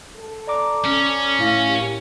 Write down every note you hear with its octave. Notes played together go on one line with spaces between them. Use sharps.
A4
D5 A#5 D6
C#4
A2 F5 A#6
A#3 G4